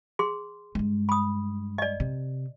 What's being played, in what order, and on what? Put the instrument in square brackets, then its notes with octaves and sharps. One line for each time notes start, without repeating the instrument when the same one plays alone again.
[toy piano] G#4 C6
[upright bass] G2 G#3
[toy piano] B5 D#6
D5 D#5
[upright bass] C3